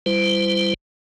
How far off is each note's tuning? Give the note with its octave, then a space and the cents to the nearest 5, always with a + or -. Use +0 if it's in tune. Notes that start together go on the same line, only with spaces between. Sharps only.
G3 +0 E4 +35 C5 -30